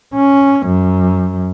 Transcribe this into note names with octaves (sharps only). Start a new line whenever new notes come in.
C#4
F#2